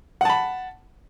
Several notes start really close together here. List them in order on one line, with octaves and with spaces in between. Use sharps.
F#5 A5 B5